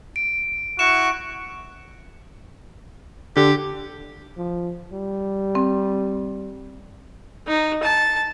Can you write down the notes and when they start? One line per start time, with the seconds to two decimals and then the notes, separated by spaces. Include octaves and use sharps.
0.16 D7
0.79 E4 F#4 C#6 E7
3.36 D3 G4
4.37 F3
4.93 G3
5.55 C4
7.48 D#4
7.83 A5